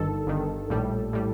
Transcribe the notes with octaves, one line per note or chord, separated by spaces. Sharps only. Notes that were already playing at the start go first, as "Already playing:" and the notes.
Already playing: G1 G2 D#3 A4
G1 G2 D#3
A#1 A2 G3
A2 G3